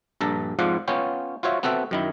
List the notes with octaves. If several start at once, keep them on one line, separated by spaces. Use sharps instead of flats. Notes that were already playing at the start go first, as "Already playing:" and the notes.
A#1 G2 A4 A5 A#5
F2 G#2 F3 F4 D5 F#5
B3 C#4 F4 C#5 G5
F4 F#4 C5 C#5 E5
B3 C4 F#4 A4 B4 E5
F#2 D#3 E4